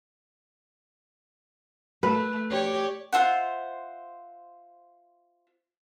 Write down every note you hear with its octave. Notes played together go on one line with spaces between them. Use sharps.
A3 B4
G4 C#5 D5
F4 C5 E5 F#5